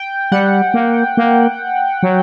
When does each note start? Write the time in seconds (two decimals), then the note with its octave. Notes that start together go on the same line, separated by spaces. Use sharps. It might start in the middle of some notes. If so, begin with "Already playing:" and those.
Already playing: G5
0.32 G3 F#5
0.74 A#3
1.17 A#3
2.03 F#3